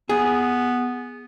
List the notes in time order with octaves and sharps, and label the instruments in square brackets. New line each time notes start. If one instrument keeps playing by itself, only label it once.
[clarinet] B3 [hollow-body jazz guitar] G#4